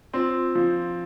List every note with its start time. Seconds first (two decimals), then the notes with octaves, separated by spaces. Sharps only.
0.14 C4 F4
0.55 F3